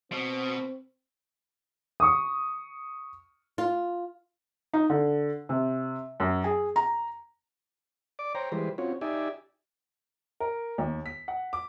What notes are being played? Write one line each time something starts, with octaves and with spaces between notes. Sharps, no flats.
B2 C4
C#6 D#6
F4
D#4
D3
C3
F#2
G#4
A#5
D5 D6
C5 C#5 G5 A#5
E3 G3 G#3 G4 B4 C5
C4 C#4 F4 F#4 C#5
D#4 G4 D5 E5 G#5
A#4
D#2
B6
F#5
D6